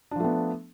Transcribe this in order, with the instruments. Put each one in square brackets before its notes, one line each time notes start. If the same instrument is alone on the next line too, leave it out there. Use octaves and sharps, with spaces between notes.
[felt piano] D4
F3
A3
B3